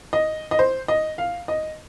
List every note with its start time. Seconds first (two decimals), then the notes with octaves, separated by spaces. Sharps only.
0.13 D#5
0.51 D#5
0.59 C5
0.88 D#5
1.18 F5
1.48 D#5